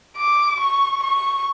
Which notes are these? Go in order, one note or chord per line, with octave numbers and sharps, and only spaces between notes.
D6
C#6
C#6